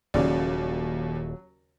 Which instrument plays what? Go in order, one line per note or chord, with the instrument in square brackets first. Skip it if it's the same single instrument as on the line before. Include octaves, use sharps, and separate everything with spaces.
[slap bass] D#1 [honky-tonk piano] D#2 [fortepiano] C#3 D5 [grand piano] F#3